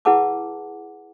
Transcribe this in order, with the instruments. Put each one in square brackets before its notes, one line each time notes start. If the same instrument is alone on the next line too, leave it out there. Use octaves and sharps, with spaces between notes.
[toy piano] E4 G#4 B4 F#5 A5 D6